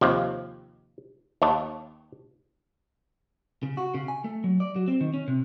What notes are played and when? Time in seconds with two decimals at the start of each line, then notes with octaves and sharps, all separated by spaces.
0.01 D#2 C3 F3
1.42 D#2 C#5 A5
3.63 C#3
3.77 F#4
3.94 C#3
4.08 G#5
4.24 A3
4.44 F#3
4.60 D5
4.76 F#3
4.88 C4
5.01 D#3
5.14 C#4
5.28 C3